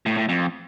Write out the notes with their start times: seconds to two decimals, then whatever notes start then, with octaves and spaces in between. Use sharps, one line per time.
0.06 A2
0.17 A2
0.29 F2